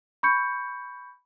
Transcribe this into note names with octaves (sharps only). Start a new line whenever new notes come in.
B5 C#6 G6 C#7